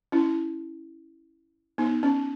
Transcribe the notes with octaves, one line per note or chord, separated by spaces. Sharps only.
C#4 E4
B3 D#4
C#4